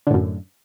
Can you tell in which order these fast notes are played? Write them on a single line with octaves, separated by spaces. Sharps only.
D3 A2 F#2